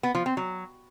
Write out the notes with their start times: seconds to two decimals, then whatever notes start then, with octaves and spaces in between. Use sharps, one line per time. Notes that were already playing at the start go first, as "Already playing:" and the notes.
0.03 B3
0.15 F3
0.26 C4
0.37 F#3